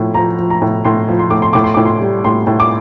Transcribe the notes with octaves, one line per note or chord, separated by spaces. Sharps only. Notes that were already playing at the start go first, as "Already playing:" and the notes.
Already playing: A2 F3
F3 A#5
F3
A#5
A2
A2 C6
F3
C6
A2 D6
C6
A2 D6
C6
A2 D6
C6
G3
A2 C6
A2
D6